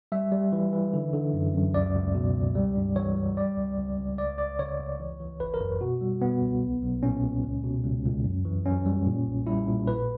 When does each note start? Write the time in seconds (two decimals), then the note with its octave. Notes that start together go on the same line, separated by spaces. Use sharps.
0.12 G3 E5
0.32 G3
0.53 E3
0.73 E3
0.93 D3
1.13 D3
1.34 F#2
1.54 F#2
1.74 C#2 D5
1.95 C#2
2.15 B2
2.35 C#2
2.55 G3
2.76 G2
2.96 E3 C#5
3.16 G3
3.37 G3 D5
3.57 C#2
3.77 C#2
3.98 C#2
4.18 C#2 D5
4.38 C#2 D5
4.59 C#3 C#5
4.79 C#2
5.00 E3
5.20 E3
5.40 G1 B4
5.54 A#4
5.60 F#2
5.81 B2 F#4
6.01 G3
6.21 B2 B3
6.42 C#2
6.62 B1
6.82 B1
7.03 A#2 C#4
7.24 A#2
7.44 C#2
7.64 B2
7.84 C#2
8.05 C#2
8.25 F#2
8.45 E3
8.65 F#2 C#4
8.86 G3
9.06 A#2
9.26 B1
9.47 G3 E4
9.67 A#2
9.87 A#1 B4